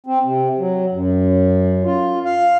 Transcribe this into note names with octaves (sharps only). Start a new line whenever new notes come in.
C4
C3
F#3
F#2
F4
F5